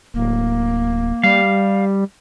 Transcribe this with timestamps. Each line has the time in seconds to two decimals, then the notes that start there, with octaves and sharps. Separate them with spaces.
0.14 D1 A#3
1.23 G3 F5